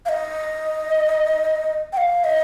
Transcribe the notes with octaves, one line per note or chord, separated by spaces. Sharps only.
F5
D#5
G5
F5
D#5